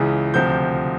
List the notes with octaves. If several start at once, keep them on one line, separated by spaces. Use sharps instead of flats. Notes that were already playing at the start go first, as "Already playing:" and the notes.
Already playing: C#2 C#3 E3
D2 C3 F3 G6